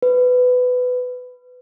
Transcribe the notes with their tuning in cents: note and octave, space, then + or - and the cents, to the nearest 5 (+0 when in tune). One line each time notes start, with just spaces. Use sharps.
B4 +15